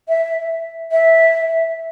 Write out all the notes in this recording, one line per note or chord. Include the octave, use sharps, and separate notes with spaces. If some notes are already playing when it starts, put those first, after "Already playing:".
E5
E5